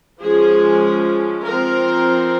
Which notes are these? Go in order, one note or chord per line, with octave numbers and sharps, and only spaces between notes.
F3 G#3 C#4 G#4
F3 C4 A#4